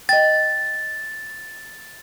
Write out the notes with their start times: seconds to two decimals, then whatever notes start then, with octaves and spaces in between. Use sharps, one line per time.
0.09 D#5 G5 A6